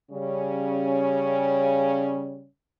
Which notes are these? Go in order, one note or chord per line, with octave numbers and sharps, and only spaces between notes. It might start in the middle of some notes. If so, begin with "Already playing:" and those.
C#3 G3 C#4